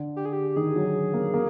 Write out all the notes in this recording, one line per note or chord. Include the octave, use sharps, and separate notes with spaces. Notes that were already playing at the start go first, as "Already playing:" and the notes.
Already playing: D3
G4
G#4
G4
D#3 G#4
F#3
A#3
A#3